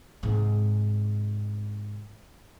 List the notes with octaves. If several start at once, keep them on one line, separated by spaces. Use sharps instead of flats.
G#2 C3